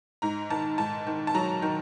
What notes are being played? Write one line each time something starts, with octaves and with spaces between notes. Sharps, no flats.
G#2 A#5
D#3 A5
G#2 A5
D#3
A5
F#3 A#5
D#3